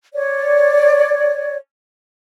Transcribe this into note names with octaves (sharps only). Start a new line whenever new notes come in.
C#5 D5